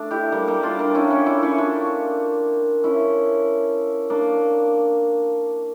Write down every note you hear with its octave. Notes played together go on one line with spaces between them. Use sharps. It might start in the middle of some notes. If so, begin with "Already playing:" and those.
Already playing: A3 D4
E4 G4
G3 A#3
G3 A#3
D4 F4
A#3 D4
C#4 E4
C#4 E4
C#4 E4
C#4 E4
D4 F4
C#4 E4
A#3 D4